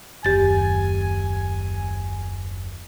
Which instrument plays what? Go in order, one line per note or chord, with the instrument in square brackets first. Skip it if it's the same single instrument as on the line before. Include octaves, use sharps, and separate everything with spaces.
[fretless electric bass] F#1 D#2 [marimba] G4 A6 [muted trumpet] G#5